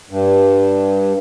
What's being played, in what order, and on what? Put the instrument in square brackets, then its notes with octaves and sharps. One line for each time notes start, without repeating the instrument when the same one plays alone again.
[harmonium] G2